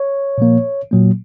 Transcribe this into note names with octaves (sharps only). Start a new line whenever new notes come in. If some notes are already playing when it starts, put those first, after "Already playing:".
Already playing: C#5
A#2 F3 A#3
A#2 F#3 A#3